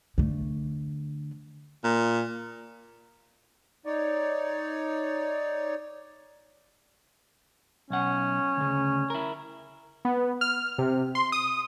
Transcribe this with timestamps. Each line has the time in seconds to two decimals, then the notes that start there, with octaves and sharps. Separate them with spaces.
0.18 D3 A3
1.84 A#2
3.85 D#4 C#5 D5
7.90 B1 C#4 F#5
8.57 D2 C#3
9.10 E4 A#4
10.05 B3
10.41 F6
10.78 C3
11.15 C6
11.32 D#6